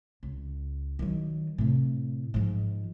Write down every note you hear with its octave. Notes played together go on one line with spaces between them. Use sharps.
C#2
D#3 F#3
A2 C3
G#2 F3